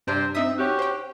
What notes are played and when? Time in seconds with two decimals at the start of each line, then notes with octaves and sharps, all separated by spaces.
0.07 G2 C3 D4 C5 A#5
0.35 C4 D#4 E5 D#6
0.58 C#4 F#4 G4
0.79 C5 G5